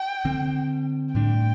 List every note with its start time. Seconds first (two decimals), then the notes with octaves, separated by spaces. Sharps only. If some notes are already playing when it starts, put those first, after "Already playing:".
Already playing: G5
0.25 D3 C4
1.15 A2 G3 D4 G5